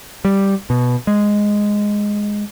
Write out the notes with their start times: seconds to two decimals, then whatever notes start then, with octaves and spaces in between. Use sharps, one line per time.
0.25 G3
0.70 B2
1.07 G#3